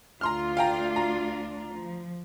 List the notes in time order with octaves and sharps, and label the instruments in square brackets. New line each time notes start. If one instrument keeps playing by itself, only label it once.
[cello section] D2 D4 F4 [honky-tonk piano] A#5 C6 F6
[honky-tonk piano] F5 G5 A#5
A#5
[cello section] F3